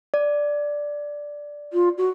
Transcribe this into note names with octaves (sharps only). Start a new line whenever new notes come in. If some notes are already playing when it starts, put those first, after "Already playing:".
D5
F4
F#4